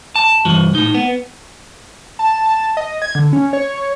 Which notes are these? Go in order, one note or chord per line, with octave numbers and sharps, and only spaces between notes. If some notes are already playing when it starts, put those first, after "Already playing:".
A5
C2 G2 E3 F#4
A2 D#4
B3
A5
A5
D#5
G#6
D3
C#4
C#5
C#5